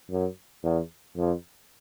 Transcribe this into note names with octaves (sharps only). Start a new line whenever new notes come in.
F#2
E2
F2